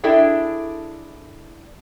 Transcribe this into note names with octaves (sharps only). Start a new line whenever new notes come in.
D4 E4 G#4 A4 E5 G5